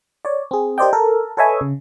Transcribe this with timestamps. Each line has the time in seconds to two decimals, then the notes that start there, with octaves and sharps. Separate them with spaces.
0.25 C#5 D5
0.51 C4 G#4
0.78 G4 A#4 C5 D5 D#5 G5
0.93 A4 A#4
1.37 A4 B4 C#5 D#5 E5 G#5
1.61 C#3